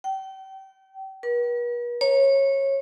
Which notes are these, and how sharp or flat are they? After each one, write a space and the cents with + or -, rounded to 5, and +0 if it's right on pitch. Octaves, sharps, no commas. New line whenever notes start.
G5 -30
B4 -45
C#5 -20